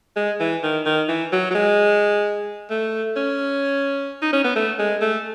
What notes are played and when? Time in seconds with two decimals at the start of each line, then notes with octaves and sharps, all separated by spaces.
0.16 G#3
0.40 E3
0.63 D#3
0.86 D#3
1.09 E3
1.32 F#3
1.51 F#3
1.55 G#3
2.70 A3
3.17 C#4
4.22 D#4
4.33 C#4
4.44 B3
4.55 A3
4.79 G#3
5.01 A3